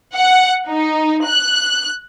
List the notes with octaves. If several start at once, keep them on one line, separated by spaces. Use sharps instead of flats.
F#5
D#4
F#6